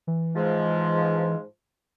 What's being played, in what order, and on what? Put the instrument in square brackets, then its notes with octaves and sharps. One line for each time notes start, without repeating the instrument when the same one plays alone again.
[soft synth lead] E3
[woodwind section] G#2 F3 G#3